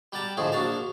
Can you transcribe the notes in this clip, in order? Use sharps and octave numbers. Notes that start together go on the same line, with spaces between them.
G3 G4 F#5 A5 A#5
A2 D3 F3 A3 D#4 G#4
A#1 D4 F#4 F5 A5 A#5